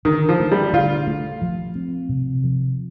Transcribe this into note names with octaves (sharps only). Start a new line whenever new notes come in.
D3 D#3
F3
A3
G3
D3 F4
A3
F3
C4
C3
F3